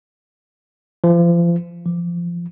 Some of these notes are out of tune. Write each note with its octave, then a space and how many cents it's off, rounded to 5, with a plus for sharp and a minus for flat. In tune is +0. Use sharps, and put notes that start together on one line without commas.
F3 -35
F3 -20